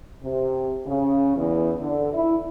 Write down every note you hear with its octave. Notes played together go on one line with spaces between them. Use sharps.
C3
C#3
E2
D3
E4